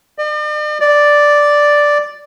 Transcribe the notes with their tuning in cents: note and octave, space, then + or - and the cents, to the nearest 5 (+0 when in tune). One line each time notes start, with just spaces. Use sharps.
D5 +45
D5 +0